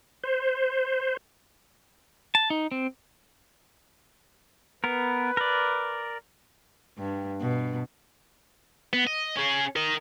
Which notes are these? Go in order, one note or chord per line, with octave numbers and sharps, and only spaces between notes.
C5
A5
D#4
C4
B3 A#4 B4
A#4 D5
G2
B2
B3
D#5
C#4 G#4
A#4 D#5